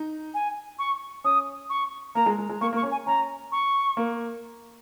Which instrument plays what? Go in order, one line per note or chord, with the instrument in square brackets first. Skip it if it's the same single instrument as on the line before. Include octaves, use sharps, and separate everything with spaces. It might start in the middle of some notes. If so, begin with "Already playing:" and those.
Already playing: [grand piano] D#4
[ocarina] G#5
C#6
[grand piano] C#4 [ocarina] D#6
[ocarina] C#6
[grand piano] A#3 [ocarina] A#5
[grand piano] G#3
G#3
G#3
[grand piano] A#3 [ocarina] C#6
[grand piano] A#3
[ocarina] C#6
[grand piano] C#4
[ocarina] G#5
[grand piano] C#4 [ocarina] A#5
[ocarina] C#6
[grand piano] A#3